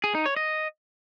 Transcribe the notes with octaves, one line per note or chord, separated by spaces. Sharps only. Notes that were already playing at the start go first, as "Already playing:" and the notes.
G#4
D#4
C#5
D#5